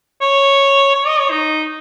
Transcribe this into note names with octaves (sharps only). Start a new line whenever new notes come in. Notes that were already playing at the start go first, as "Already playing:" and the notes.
C#5
C#5
D#5
C#5
D#4